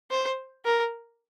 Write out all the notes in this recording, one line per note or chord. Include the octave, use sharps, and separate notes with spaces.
C5
A#4